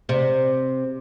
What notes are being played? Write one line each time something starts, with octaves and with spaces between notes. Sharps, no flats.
C3